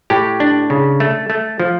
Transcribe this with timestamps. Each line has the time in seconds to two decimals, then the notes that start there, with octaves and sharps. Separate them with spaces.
0.10 A2 G4
0.40 D4
0.70 C#3
1.00 A3
1.30 A3
1.60 F3